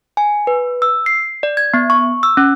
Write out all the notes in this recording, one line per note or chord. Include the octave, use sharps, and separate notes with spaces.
G#5
B4
E6
C7
D5
G#6
B3
C#6
E6
C#4